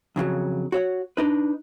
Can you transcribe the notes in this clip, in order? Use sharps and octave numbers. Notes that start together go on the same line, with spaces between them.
F2 C#3 E3 F#3
F#4 C#5 F#5
D4 D#4 B4